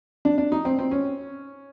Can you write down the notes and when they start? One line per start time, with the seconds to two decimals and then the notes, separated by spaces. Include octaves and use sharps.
0.25 D4
0.38 D4
0.52 D#4
0.65 C4
0.79 C4
0.91 C#4